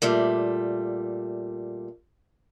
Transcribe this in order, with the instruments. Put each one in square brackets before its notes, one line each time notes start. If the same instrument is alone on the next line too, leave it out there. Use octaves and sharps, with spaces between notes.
[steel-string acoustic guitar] A#2 G3 A3